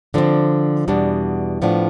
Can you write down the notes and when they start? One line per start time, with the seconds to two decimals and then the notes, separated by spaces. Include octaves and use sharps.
0.14 D3 F3 C4 D4
0.88 E2 B2 G3 D4
1.62 A2 F3 B3 D4